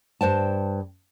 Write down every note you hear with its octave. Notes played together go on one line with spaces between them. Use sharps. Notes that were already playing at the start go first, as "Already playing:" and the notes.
G2 C5 G5 A5